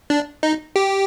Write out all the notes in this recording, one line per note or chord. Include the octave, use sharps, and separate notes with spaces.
D4
D#4
G4